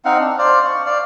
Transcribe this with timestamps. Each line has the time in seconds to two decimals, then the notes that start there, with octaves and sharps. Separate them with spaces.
0.05 C4 D#4 F5 F#5
0.20 D4
0.38 C5 D5 F5
0.65 C#6
0.86 D5 F5